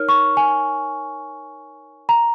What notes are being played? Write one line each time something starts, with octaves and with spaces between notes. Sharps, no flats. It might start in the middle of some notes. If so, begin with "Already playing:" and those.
Already playing: D#4 A#4 C#5 F6
C#6
G#5
A#5